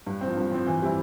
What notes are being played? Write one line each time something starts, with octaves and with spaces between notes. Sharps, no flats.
G2
C4
F3
G2
F3 C4
E3
G3 C4 E4